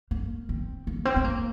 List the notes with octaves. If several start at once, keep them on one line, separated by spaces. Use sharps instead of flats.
A#3
C4
A#3
C4
C4
A#3